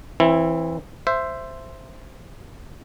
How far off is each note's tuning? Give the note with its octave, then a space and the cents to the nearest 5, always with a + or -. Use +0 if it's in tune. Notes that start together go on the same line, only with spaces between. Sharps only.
E3 +0 C4 +25 E4 +0
C5 +0 E5 +15